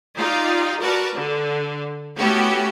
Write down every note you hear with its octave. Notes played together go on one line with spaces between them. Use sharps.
D#4 F4 G4 D5
F#4 A#4 B4 D5 A5
D3
A3 B3 C#4 E4 F#4 G4